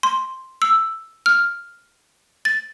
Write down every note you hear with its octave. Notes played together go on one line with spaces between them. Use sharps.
C6
E6
F6
A6